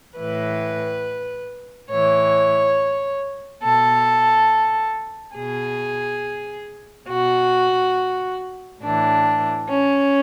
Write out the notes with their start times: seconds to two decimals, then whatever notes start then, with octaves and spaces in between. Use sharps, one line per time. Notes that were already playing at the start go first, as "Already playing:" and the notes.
0.17 A2 E3 B4
1.91 A2 E3 C#5
3.64 B2 A4
5.37 B2 G#4
7.09 B2 F#4
8.83 A2 E3 D4
9.70 C#4